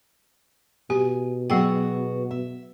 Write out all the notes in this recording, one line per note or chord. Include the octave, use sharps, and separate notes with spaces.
B2 G4 G#5
F#3 B3 F#4 G#4 G5
E5